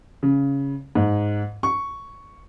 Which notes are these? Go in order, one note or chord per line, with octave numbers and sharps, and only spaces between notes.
C#3
G#2
C#6